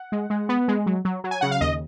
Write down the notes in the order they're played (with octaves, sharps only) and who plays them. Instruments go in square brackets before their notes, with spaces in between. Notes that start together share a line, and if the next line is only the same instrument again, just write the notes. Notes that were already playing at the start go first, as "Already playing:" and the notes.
Already playing: [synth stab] F#5
G#3
G#3
B3
G#3
F#3
F#3
F#3
G#5
C#3 F#5
F5
D#2 D#5